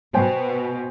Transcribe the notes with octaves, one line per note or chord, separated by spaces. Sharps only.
B2 C5 G5 G#5